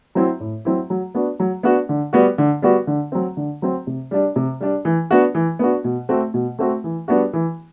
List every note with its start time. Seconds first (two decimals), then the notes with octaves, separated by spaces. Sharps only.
0.15 F#3 C4 E4
0.40 A2
0.65 F#3 C4 E4
0.90 F#3
1.15 B3 D4 F#4
1.40 F#3
1.63 B3 D4 F#4
1.89 D3
2.13 G3 B3 F#4
2.38 D3
2.62 G3 B3 F#4
2.87 D3
3.12 F#3 C4
3.37 D3
3.62 F#3 C4
3.87 C3
4.11 G3 D4
4.36 C3
4.61 G3 D4
4.85 E3
5.11 B3 D4 F#4
5.35 E3
5.59 B3 D4 F#4
5.84 B2
6.09 A3 C4 F#4
6.34 B2
6.59 A3 C4 F#4
6.84 E3
7.08 G3 B3 D4 F#4
7.33 E3